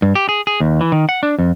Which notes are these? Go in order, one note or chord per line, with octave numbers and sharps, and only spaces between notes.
G2
G4
G#4
G#4
D#2
E3
D#3
F#5
D4
F2